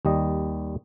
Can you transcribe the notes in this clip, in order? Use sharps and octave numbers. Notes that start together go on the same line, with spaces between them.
D#2 G3 D#5